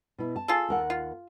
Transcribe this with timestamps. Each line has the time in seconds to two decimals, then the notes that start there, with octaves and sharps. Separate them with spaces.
0.18 B2 E4
0.36 A5
0.48 F4 G#4 A4
0.69 D#2 A#4 F#5
0.90 F4